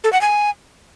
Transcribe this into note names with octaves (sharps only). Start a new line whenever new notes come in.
A4
F#5
G#5